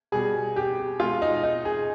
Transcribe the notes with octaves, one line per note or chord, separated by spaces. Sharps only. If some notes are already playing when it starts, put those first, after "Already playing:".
B2 G3 G#4
G4
B2 G#3 F4
D#4
D#4
G#4